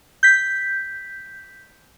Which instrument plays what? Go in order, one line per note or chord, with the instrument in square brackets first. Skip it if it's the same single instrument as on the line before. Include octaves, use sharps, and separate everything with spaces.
[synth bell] G6 B6